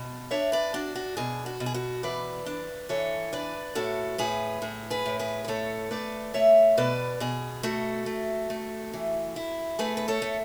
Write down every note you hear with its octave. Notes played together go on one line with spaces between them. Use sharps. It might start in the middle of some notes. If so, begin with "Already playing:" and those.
Already playing: B2
D4 C#5 E5
B4 D5
D4 F#4
F#4
B2 G#4
F#4
B2
G#4
F#4
E3 B4 D5
D4
E3 A4 C#5
D4 B4 D5
A2 F#4 A4
A2 G#4 B4
A2 G#4
G#4 B4
A2
G#4 B4
B4
A3 A4 C#5
A3 B4 D5
A3 C#5 E5
B2 B4 D5
B2 G#4
A3 F#4 A4
A3
A3
E3
E4
A3 G#4 B4
B4
A4 C#5
A3